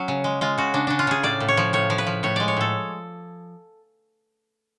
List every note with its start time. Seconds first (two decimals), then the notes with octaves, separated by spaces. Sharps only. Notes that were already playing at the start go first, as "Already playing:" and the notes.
Already playing: F#3 C#4
0.08 C#3
0.24 G#3
0.41 G#3 F4
0.58 C#3 F#4
0.74 C#3 D4
0.87 C#3 D4
0.99 F4
1.07 C#3 G#4
1.23 A2 D5
1.40 A2
1.48 C#5
1.57 F3
1.73 A2 C#5
1.90 F3
1.98 B4
2.07 F3
2.23 A2 C#5
2.36 G#3 D5
2.48 C#5
2.57 A2 A4